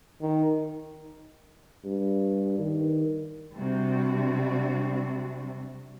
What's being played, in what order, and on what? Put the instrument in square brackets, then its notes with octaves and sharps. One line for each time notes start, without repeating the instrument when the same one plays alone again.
[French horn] D#3
[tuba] G2
D#3
[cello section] C3 G3 D4 F#4